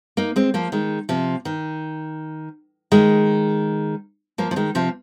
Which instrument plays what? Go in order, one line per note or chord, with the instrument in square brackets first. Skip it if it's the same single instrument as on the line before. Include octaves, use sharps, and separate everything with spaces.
[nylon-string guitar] A#3 D#4
G#3 C4
F3 A#3
D#3 G#3
C3 F3
D#3
D#3 G#3
F3 A#3
F3
D#3 G#3
C3 F3